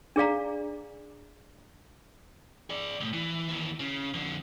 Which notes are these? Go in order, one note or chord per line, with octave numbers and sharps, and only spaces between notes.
D4 G#4 D5 F5 A#5
G#4 D5
C#2 A2
E3
D#2 E3
C#3
F2 D3